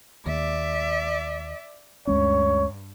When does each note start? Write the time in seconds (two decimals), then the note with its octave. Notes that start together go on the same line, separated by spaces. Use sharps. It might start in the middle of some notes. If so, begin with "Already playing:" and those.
0.26 D#2 D5 E5
2.07 D2 G2 G#3 C#4 C#5